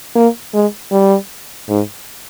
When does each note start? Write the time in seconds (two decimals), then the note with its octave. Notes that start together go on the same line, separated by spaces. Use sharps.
0.16 A#3
0.54 G#3
0.92 G3
1.69 G#2